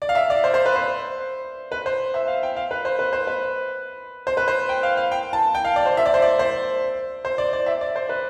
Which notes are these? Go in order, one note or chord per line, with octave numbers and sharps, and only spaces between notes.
D5
F5
E5
D5
C5
C5
B4
C5
B4
C5
E5
F5
G5
F5
B4
C5
B4
C5
B4
C5
B4
C5
G5
F5
F5
G5
A5
G5
F5
D5
C5
E5
D5
C5
D5
C5
C5
D5
D5
E5
D5
C5
B4